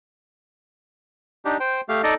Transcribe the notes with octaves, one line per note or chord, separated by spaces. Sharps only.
D4 D#4 G4
C5 G5
A3 G4 F5
D#4 A4 D5 D#5